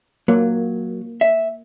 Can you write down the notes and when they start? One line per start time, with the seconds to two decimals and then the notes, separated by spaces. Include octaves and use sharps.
0.28 F#3 A#3
1.21 E5